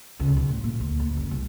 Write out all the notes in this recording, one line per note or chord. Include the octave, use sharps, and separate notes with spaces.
C#2
B1
A2
A#2
D2
D2
F#1
C2